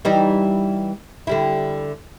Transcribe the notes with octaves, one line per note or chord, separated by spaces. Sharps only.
E3 G3 D#4
D3 G3 E4